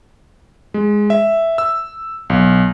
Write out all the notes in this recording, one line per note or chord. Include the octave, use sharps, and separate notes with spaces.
G#3
E5
E6
B1